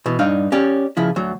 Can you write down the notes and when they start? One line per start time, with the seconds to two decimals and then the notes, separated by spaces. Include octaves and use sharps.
0.06 B2 E3
0.19 G2 D4 D#4 F5
0.52 C#4 G4 D5
0.97 C#3 F3 E4
1.16 D2 F#3